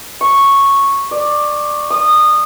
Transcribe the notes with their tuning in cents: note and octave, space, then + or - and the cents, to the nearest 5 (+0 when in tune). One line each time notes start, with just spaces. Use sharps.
C#6 -5
D5 +15
D#6 -20